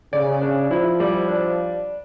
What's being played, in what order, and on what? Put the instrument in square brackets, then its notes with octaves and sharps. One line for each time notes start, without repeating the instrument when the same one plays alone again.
[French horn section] C#3 [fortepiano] D5
[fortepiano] D4
[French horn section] F3 [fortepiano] E4
[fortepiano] G3
D4